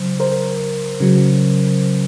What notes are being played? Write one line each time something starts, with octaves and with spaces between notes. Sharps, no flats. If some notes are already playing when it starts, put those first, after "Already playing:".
Already playing: C#3 F#3 C5
A#4 C5
C#3 F#3